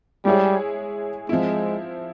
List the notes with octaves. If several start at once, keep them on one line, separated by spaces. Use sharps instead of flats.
G3 G#3 E4 G#4 C#5
F3 G#3 C4 E4